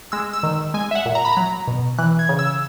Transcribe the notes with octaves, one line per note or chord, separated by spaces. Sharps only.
G#3 E6
E6
D#3
G#3 G#5
E5
F#5
A#2
A#5
B5
F#3 A#5
B2
E3 F#6
G#6
C#3
E6